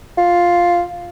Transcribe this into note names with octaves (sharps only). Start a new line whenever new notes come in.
F4